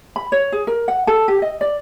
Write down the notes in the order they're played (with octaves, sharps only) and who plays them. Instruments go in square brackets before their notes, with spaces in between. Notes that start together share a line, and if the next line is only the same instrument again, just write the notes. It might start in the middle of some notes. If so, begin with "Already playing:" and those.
[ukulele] B5
C#5
G#4
A#4
F#5
A4
G4
D#5
D5